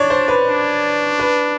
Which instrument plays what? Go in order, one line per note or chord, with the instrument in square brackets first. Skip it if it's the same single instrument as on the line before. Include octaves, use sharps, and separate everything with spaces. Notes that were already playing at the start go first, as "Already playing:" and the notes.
Already playing: [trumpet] D4 [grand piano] C#5 D5
[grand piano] C5
B4
[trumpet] D4
[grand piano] B4